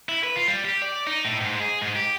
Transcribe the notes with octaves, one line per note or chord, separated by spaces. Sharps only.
E4
B4
F4
G3
G4
D5
D#4
A2
G#2
G#4
G#2
G4